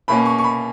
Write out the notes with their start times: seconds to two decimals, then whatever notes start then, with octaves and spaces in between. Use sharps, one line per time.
0.08 B2 A#3 C#4 B5
0.26 C#6
0.39 C#6
0.44 B5